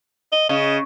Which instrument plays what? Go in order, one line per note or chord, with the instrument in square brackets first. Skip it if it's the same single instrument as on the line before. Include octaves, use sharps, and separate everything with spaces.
[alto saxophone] D#5
[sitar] C#3 [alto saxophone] D#5